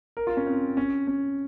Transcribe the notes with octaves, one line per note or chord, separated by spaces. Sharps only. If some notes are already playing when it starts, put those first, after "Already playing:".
A#4
F4
C#4
C4
C#4
C#4